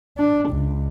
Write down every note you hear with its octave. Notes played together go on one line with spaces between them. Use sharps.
D4
C#2